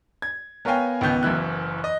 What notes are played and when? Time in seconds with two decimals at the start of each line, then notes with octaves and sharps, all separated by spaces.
0.22 G#6
0.65 B3 A#4 C#5 F5 G5 G#5
1.01 C#2 D#3 B3 G6
1.23 F#1 F#2 E3 E4 F#6
1.84 D#5